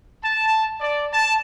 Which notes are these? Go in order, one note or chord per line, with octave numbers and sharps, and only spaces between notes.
A5
D5
A5